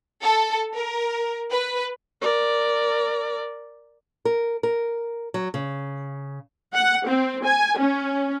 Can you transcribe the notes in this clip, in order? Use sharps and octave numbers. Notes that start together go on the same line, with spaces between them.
A4
A#4
B4
A#4 D5
A#4
A#4
F#3
C#3
F#5
C4
G#5
C#4